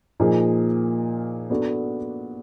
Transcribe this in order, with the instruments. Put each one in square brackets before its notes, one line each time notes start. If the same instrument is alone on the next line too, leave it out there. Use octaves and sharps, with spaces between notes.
[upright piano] A#2 F3 A#3 D#4 G#4
B3 D4 F#4 A4